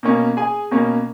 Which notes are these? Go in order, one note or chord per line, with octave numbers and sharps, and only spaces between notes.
B2 A#3 C#4
G#4 G#5
B2 A#3 C#4